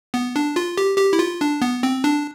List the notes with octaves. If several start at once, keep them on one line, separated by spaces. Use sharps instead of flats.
B3
D4
F4
G4
G4
E4
F4
D4
B3
C4
D4